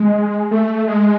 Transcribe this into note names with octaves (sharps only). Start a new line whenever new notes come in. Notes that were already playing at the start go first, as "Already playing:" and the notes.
Already playing: G#3
A3
G#3